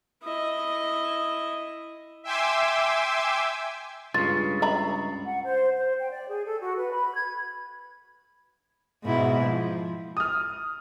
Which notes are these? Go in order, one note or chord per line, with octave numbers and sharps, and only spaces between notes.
E4 D#5
E5 G5 G#5 C6 D6 E6
C#2 G2 C#3 F4 A6
E5 A#5 B5
F#5
C5
C5
G5
D5
G#4
A4
F#4
B4
B5
G#6
G#2 B2 E4
F3
D#6 F6